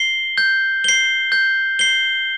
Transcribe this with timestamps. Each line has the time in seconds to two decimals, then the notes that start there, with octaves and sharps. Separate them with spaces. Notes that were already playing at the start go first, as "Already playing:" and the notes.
Already playing: C7 G7
0.38 G6
0.84 C7 G7
1.32 G6
1.79 C7 G7